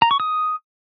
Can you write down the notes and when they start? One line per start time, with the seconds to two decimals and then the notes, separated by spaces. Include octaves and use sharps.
0.02 A#5
0.11 C#6
0.20 D#6